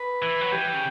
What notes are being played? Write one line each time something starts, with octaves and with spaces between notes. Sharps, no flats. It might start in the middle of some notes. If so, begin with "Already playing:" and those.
Already playing: B4
E3
F#3
E3 G4
C#3